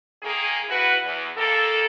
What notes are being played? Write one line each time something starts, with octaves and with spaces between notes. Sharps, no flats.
D#3 A#3 G#4
E4 F#4 B4
E2
D#2 A#3 A4